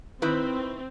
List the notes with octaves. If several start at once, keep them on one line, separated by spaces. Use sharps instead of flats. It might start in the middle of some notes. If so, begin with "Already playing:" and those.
D#3 C4 E4 B4